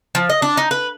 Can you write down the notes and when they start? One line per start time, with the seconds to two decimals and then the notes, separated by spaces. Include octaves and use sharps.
0.15 F3
0.30 D#5
0.42 D4
0.57 D#4
0.71 B4